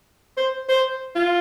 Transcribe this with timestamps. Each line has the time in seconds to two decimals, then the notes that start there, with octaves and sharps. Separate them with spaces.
0.37 C5
0.69 C5
1.16 F4